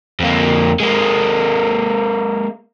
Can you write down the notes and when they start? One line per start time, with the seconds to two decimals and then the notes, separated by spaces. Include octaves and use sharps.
0.20 F2 A#3
0.80 G#3 A#3